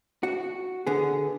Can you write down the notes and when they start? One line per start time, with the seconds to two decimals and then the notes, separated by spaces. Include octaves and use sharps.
0.23 F#4
0.87 D3 B3 G#4